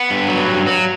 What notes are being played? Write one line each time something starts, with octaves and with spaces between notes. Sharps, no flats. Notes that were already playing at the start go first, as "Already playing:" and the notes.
Already playing: B3
G2
F#3
G2
F#3